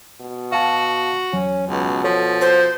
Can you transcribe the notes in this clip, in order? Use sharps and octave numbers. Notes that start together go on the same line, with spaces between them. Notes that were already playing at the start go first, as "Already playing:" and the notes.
B2
F#4 F5 A5
E2 F#3 C#4
C#2 B2
F3 A4 C#5
C5